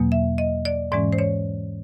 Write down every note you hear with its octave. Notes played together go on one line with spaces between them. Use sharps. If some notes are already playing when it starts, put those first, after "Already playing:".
Already playing: E2 B2 F#3 A#3
E5
D#5
D5
G#2 E3 G#3 C#4 D5
C5
C#5